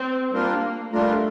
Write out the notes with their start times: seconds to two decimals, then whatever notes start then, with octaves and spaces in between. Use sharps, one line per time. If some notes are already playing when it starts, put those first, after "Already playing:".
Already playing: C4
0.32 G3 A#3 D4 F4 A#4
0.92 G3 A3 D4 F4 A#4